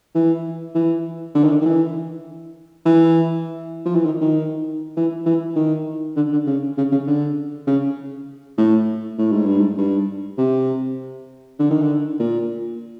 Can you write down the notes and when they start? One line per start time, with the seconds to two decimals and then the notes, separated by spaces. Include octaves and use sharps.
0.15 E3
0.75 E3
1.35 D3
1.44 D#3
1.51 D3
1.61 D#3
1.66 E3
2.85 E3
3.86 F3
3.95 E3
4.06 D#3
4.21 D#3
4.97 E3
5.26 E3
5.56 D#3
6.16 D3
6.32 D3
6.47 C#3
6.78 C#3
6.92 C#3
7.07 D3
7.67 C#3
8.58 A2
9.18 A2
9.32 G#2
9.46 G2
9.60 G#2
9.78 G2
10.38 C3
11.59 D3
11.70 D#3
11.82 D3
12.19 A#2